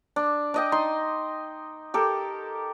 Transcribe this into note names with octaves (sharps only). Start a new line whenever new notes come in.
D4
D4 D#5 G5
D#4 C6
G4 A4 A#4